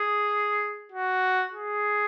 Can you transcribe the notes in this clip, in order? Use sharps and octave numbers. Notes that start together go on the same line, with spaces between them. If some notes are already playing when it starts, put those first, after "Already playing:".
Already playing: G#4
F#4
G#4